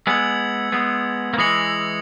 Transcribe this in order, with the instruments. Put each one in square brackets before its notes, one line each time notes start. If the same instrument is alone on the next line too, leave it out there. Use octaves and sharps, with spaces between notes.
[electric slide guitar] G#3 B3 [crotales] E6 G#6 C#7 F#7
[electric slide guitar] G#3 B3
A#3
[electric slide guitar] E3 G#3 [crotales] D#6 A#6 C#7 F#7